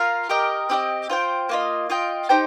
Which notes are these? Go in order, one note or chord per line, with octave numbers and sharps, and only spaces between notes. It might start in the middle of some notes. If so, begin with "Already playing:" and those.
Already playing: F4 A#4 F5
G4 A#4 D#5 G5
C4 G4 A#4 D#5
F4 C5 G5
A#3 F4 D#5
F4 D#5 G5
D#4 G4 C5 G5